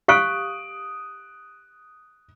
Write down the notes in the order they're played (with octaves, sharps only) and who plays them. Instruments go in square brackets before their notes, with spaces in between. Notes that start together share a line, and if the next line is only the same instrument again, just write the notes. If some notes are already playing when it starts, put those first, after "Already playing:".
[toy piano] G4 F5 C#6 [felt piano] D#6 F#6 D7